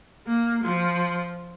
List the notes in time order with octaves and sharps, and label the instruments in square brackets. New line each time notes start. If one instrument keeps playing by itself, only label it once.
[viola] A#3
F3